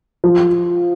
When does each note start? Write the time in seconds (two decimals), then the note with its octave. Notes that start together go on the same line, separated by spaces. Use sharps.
0.24 F3